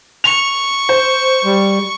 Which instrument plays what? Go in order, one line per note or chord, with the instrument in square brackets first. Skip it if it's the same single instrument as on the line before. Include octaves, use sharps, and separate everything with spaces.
[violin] C#6 [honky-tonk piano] F7
[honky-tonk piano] C5
[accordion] G3